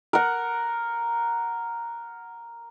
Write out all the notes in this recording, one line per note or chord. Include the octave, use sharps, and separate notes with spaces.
A#4 F#5